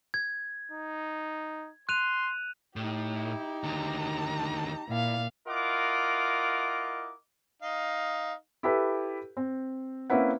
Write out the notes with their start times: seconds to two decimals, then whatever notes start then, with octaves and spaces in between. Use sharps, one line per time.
0.14 G#6
0.72 D#4
1.89 C6 F#6 D#7 F7
2.76 A2 D#4 G4
3.14 E4
3.64 D#2 D3 A#5
4.89 A#2 E4 D5 F5
5.48 E4 F4 A#4 D#5 F#5 D6
7.62 D#4 F5
8.63 E4 G4 A4 B4
9.37 C4
10.10 A#3 C4 C#4 E4 B4 F#5